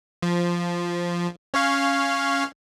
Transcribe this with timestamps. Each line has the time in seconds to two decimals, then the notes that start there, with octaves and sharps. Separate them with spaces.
0.22 F3
1.54 C#4 C#5 F5